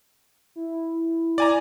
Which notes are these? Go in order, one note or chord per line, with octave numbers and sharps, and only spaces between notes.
E4
D5 G#5 A#5